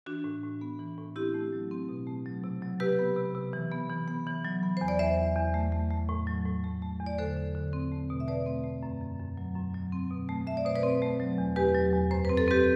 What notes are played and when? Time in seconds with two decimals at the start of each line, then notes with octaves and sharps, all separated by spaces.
0.06 E3 D4 F#4
0.24 A2
0.43 A2
0.61 B3
0.80 E3
0.98 A2
1.16 C4 E4 G4
1.34 A3
1.53 F#3
1.71 C4
1.89 B2
2.07 A3
2.26 F#3
2.44 C3
2.62 F#3
2.80 C3 G4 B4
2.99 B3
3.16 C3
3.35 C3
3.53 E3
3.72 B3
3.90 E3
4.08 B3
4.27 E3
4.44 F#3
4.63 B3
4.77 E2 C5
4.88 D5
4.99 E2 C5 E5
5.18 E2
5.36 E2
5.54 A3
5.72 A3
5.90 A3
6.09 A2
6.27 F#3
6.46 A2
6.64 A3
6.82 A3
7.00 E2
7.06 D5
7.18 D3 A4 C5
7.36 D3
7.55 D3
7.73 C4
7.92 A3
8.10 B2
8.20 E5
8.28 A3 B4 D5
8.46 C4
8.64 A3
8.83 F#2
9.01 F#2
9.19 F#2
9.37 F#3
9.56 F#2
9.74 F#3
9.92 C4
10.10 B2
10.29 A3
10.47 A3 E5
10.57 D5
10.65 B2 C5
10.75 B4 D5
10.83 C4
11.02 A3
11.20 F#3
11.38 E2
11.56 E2 G4 B4
11.74 F#3
11.93 E2
12.11 F#2 C5
12.25 C4 B4
12.37 A4
12.48 C4 G4 B4